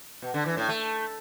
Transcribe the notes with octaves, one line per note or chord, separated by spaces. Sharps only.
B2
D3
E3
A2
A3